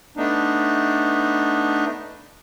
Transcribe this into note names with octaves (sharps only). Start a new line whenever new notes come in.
A3 B3 D4 D#4